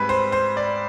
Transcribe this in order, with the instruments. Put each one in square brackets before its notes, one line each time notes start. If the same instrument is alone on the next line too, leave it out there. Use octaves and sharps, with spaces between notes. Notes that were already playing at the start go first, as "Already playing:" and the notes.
Already playing: [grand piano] G#2 G3 C4 B4
C5
C5
D5